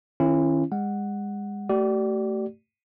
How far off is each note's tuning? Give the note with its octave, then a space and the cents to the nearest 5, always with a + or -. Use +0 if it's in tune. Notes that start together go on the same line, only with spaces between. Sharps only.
D#3 +0 C#4 -30 E4 +35
G#3 -35 F#5 +0
A3 +10 G4 -40 D5 +0